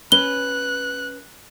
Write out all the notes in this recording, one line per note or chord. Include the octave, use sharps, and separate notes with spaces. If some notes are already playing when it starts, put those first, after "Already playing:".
C#4 B4 F#6 G7